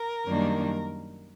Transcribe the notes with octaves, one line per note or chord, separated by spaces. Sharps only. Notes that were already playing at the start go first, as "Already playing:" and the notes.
Already playing: A#4
F#2 D#3 G3 A#3 D4